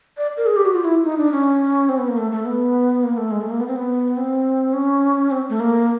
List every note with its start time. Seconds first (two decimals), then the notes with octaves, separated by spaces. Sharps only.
0.17 D5
0.37 A#4
0.46 G#4
0.56 G4
0.65 F#4
0.75 F4
0.85 E4
1.04 D#4
1.18 D4
1.32 C#4
1.89 C4
1.98 B3
2.08 A#3
2.18 A3
2.32 A3
2.45 B3
3.03 A#3
3.17 A3
3.31 G#3
3.41 A3
3.50 A#3
3.60 B3
3.68 C4
3.76 B3
4.17 C4
4.74 C#4
5.31 C4
5.49 A3
5.60 A#3